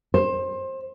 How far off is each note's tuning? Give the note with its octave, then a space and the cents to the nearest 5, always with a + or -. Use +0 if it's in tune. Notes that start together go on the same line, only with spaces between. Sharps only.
C5 +25